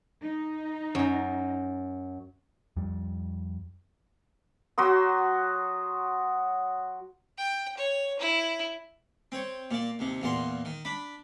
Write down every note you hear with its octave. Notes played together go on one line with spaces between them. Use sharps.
D#4
F#2
F2 G3
F#3 F#4 C6 D#6
G5
C#5
E4
C4 C#5
A#2 D5
D#2 C3
E2 A#2 C6
D#3
D4 B5